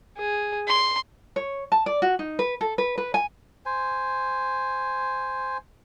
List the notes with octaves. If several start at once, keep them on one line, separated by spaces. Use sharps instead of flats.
G#4
C6
C#5
A5
D5
F#4
D#4
B4
A4
B4
B4
G#5
C5 G#5